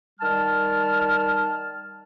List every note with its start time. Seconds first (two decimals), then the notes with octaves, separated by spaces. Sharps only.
0.20 D#3 G3 A5 F6